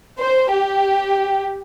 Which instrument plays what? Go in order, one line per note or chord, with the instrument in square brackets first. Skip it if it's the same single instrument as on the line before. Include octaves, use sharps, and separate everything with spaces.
[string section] C5
G4